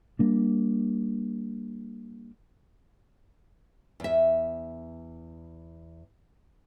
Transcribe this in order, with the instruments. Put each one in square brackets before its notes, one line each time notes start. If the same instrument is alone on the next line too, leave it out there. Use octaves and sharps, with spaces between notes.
[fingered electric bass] G3 A#3 D4
[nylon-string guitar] E2 E5